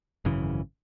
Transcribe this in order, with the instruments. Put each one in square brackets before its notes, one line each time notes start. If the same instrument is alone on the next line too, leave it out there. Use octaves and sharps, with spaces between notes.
[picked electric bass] G#1 F#2 C#3 E3